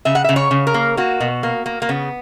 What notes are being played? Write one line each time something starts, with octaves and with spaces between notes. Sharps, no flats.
C#3 E5
F#5
C#3 E5
C#5
C#3
A#4
A#3
A#3 F#4
B2
A#3
A#3
A#3
C#3 B3